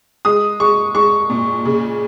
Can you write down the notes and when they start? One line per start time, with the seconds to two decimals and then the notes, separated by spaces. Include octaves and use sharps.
0.25 G#3 D#6
0.60 G#3 C#6
0.95 G#3 C#6
1.30 A#2
1.65 C#3